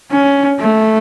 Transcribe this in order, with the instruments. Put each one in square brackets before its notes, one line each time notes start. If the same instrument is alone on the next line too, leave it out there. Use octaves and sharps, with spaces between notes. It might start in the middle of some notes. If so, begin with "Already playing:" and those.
[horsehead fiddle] C#4
A3